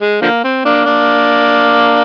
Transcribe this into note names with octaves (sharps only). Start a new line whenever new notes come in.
G#3
D3 F3 A#3
C4
A#3 D4
A#3 D4